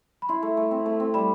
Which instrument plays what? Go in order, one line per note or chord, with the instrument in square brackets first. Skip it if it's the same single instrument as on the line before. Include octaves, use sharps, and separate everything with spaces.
[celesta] B5
[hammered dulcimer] E4 [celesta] C6
[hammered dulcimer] A3
A3
C4
A3
C4
[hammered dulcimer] G3 [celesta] B5